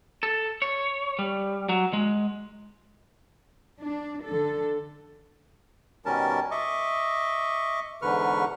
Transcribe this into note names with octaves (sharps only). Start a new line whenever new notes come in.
A4
C#5
G3
F#3
G#3
D4
D3 A4
B2 D#3 G3 C#4 A#4 A5
D#5 E5 C#6 D6
E2 G#2 D3 B4 C#6 F6